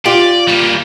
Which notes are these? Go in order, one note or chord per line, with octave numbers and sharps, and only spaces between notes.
F4 G4 D5
G3 A#3